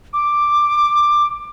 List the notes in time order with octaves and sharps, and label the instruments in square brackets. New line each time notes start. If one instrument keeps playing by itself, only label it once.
[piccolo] D6